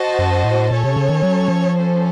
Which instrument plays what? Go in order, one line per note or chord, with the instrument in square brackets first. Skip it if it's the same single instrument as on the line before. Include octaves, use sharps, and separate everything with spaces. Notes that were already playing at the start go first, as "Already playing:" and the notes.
Already playing: [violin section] F#4 C5 D#5 A5
[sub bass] F#2
A2
[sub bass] A#2 [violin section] C#4 A4 C#5
[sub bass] C3
C#3
D#3
F#3
F3
[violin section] C#4 A4 C5